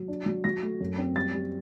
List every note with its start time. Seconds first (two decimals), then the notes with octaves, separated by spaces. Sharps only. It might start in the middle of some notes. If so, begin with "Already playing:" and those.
Already playing: F#3
0.08 D4
0.26 F#3
0.44 F#3 A#6
0.63 A3
0.81 F#2
0.98 C4
1.16 G3 A6
1.34 G3